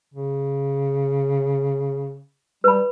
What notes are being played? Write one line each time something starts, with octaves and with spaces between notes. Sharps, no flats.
C#3
G3 B4 B5